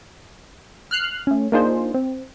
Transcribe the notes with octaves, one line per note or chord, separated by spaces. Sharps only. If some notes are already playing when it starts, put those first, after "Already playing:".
F6 F#6 C7
A3 C#4
A#3 D4 D#4 F4 G#4 C5
C4